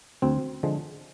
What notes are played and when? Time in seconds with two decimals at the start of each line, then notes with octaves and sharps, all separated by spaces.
0.22 D2 C4
0.63 D3 F3 G#3